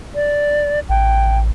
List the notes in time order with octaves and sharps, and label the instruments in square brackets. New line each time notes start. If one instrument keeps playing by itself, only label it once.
[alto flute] D5
[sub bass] A1 [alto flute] G5